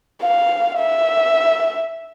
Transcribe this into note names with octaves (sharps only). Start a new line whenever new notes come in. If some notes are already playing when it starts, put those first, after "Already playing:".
F5
E5